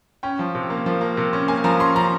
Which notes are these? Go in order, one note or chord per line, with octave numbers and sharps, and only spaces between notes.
C#4 G5
F3
C3
A#3
F3
A#3
C3
C#4
A#3 G#5
F3 A#5
C#4 C6
F3 A#5